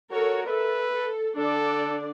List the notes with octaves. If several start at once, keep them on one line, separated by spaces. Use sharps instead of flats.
F#4 A4 A#4 C#5
A4 B4 E5
A4
D3 D4 A4 D5